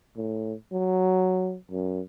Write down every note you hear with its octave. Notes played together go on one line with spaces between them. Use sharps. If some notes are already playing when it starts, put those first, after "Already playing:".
A2
F#3
F#2